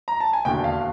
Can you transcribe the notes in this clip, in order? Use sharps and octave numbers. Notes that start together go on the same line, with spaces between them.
A#5
A5
G#5
E1 D#2 D3 G5
F5